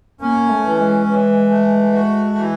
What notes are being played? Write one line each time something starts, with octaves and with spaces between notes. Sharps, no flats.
A#3 C#4
A3
E3
G#3
E3
A3
F#4
E3